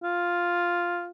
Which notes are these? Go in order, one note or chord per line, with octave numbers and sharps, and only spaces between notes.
F4